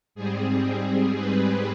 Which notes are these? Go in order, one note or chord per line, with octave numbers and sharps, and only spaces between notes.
G#2 G3 C4 G#4
G#4
B4